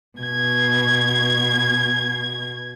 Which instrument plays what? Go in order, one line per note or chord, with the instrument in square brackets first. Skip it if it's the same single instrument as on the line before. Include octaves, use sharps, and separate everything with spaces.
[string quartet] B2 G#6